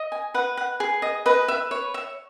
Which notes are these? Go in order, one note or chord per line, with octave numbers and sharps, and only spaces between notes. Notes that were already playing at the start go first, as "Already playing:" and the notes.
Already playing: D#5
G#5
B4 F#5
F#5
G#4
D#5
B4 D#5
E5
C#5
E5